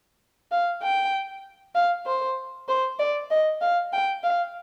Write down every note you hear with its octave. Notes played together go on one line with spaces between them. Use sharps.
F5
G5
F5
C5
C5
D5
D#5
F5
G5
F5